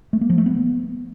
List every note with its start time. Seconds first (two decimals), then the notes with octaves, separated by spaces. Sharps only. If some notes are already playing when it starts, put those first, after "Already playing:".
0.13 A3
0.21 A#3
0.30 F3
0.38 A3
0.46 B3